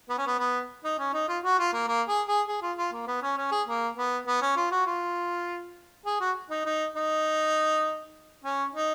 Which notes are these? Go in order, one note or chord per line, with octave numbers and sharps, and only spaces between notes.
B3
C#4
B3
B3
D#4
C#4
D#4
F4
F#4
F4
A#3
A#3
G#4
G#4
G#4
F4
F4
A#3
B3
C#4
C#4
G#4
A#3
B3
B3
C#4
F4
F#4
F4
G#4
F#4
D#4
D#4
D#4
C#4
D#4